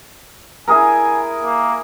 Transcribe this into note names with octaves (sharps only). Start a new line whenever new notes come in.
E4 G#4 A#4 G#5
A#3